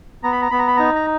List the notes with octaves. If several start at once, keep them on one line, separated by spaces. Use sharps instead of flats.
B3 A#5
B5
A#5
B3 B5
A#5
B5
D#4 A#5
A#5